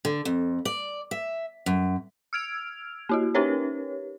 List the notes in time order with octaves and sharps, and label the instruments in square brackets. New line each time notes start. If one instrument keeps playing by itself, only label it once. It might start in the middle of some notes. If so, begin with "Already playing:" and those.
[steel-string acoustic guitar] D3
F2
D5
E5
F#2
[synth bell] E6 F6 G#6 D7 F7
A#3 E4 F#4
C#4 D#4 G4 A#4 B4 C#5